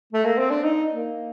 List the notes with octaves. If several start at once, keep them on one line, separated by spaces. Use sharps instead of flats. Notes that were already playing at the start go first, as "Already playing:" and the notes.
A3
A#3
C4
D4
D#4
A#3